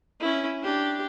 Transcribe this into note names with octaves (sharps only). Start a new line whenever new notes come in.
C#4 E4
D4 G4